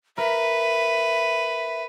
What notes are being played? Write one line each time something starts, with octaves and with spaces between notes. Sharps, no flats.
A#4 B4 E5